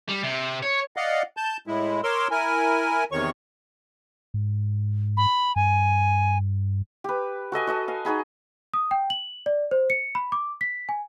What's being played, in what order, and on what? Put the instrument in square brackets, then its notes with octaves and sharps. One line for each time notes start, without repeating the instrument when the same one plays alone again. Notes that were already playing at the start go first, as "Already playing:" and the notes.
[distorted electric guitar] G3
C3
C#5
[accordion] D5 D#5 F5 F#5
A5 G6
A2 G#3 E4
A#4 C#5 C6 D6 E6
E4 A#4 G#5
E2 C3 D#3 C#5 C#6
[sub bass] G#2
[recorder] B5
[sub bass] G2 [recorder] G#5
[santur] G4 B4
F#4 A4 D#5 G#5
F#4 D#5 A5
F5 G#5
D#4 F#4 G#4 B5
[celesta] D#6
G5
F#7
D5
C5
C#7
B5
D6
B6
G#5